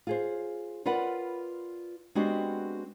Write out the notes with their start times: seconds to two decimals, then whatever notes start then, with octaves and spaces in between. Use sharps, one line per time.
0.07 F4 G#4 C5
0.85 F4 A#4 B4 D5 F#5
2.15 G#3 B3 C4 D4 F#4 G4